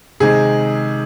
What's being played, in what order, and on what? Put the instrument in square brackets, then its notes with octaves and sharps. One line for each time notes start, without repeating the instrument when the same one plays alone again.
[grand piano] C3 D#3 G#3 G#4